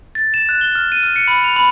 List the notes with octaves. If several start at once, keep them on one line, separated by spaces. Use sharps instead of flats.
A6
E7
F#6
G7
F6
D#7
F6
C#7
B5
F7
B5